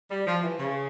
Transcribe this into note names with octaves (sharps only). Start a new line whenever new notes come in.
G3
F3
E3
C#3